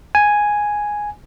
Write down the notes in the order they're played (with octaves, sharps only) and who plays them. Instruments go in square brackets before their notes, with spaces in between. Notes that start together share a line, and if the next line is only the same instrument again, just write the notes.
[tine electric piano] G#5